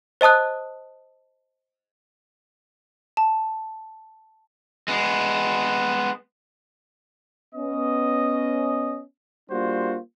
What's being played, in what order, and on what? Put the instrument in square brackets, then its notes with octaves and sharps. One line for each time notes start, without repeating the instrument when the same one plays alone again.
[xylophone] C5 D#5 A5 D#6 F#6
A5
[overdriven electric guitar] G#3 B3
[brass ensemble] B3 C#4 D#5
G3 A#3 D4 F4 F#4 C5